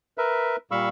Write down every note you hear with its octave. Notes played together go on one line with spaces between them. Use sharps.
A#4 B4 E5
A#2 G3 F5 B5 C#6 E6